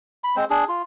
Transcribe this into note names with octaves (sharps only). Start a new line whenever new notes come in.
B5
G#3 C4 C5
D4 G#4
F4